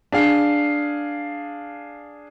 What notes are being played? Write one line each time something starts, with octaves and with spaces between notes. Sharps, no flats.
D4 G#4 F5